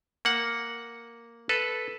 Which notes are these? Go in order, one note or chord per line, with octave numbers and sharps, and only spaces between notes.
A#3 F#5
A4 B4